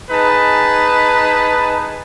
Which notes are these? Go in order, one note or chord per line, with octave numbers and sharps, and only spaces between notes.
D#4 G#4 B4 A5